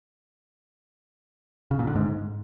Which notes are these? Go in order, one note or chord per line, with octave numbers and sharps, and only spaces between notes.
C#3
A#2
D3
G#2